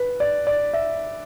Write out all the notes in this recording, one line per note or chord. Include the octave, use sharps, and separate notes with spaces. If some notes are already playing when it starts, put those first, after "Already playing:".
Already playing: B4
D5
D5
E5